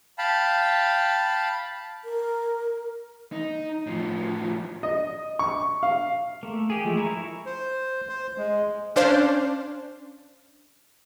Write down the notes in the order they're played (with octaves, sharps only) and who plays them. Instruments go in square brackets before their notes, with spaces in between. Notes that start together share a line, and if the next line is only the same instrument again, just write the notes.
[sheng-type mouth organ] F5 G5 A5 B5
[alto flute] A#4
[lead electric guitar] D#4
A2 F3
[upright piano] D#5
C#6
F5
[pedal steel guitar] A3 A#3
G4 G#4
F3 G#3 A3
E4 A#4 E5 A#5 C#6
[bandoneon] C5
C5
G#3
[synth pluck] C#4 D4 C5 F5